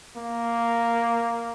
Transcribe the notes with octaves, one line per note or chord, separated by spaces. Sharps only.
A#3